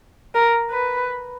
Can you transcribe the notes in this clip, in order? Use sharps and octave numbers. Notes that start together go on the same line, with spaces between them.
A#4
B4